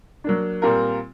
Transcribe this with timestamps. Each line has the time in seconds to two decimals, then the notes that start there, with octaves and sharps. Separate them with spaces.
0.24 F#3 A#3 D4
0.62 A#2 G3 C4 F4 A#4